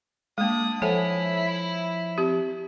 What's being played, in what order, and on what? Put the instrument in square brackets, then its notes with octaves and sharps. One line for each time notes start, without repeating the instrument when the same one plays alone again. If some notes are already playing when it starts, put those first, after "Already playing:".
[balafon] G#3 A#3 [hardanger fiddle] D4 D#6
[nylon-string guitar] F3 C#5 G#5 [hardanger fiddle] E4 [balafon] A4 E5 F#5
[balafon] C4 G4